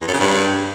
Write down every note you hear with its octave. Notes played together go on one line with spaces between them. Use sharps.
E2
F#2
C#3
G2